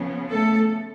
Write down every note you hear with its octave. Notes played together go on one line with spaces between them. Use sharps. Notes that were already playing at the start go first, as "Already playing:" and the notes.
Already playing: C#3 F3 B3
A3 A4